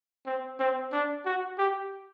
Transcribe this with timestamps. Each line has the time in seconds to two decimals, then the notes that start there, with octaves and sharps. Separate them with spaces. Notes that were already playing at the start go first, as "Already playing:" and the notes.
0.26 C4
0.60 C4
0.92 D4
1.25 F#4
1.58 G4